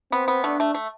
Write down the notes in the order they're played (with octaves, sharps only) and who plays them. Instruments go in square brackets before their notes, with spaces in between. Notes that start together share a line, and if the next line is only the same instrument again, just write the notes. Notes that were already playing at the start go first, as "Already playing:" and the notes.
[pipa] B3 [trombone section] C4
[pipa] B3
[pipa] A3 [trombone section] D4
[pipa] A3
A3